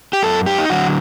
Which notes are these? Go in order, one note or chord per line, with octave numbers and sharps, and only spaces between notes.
G4
F#2 A4
G4
D#4
D3 F#3 F#4